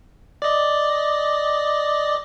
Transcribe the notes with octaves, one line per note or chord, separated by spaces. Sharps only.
D5 D#5